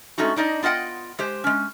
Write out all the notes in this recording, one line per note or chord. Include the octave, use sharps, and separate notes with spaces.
G#3 A3 C#4 D#4 F#4
D4 D#4 D5 D#5
B3 F4 D#5 F#5 G5
G#3 G4 C5
G#3 C#4